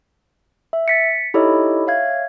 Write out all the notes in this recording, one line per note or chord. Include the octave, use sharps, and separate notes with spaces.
E5
A6 B6 C#7
D#4 E4 G4 A4 C#5 D#5
C#5 E5 F5 G#6